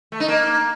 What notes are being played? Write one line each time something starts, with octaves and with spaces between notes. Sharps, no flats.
A3
D#4
A#3